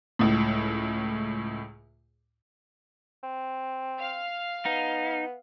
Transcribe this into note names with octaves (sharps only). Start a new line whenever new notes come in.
C#2 A2
C4
F5
B3 D#4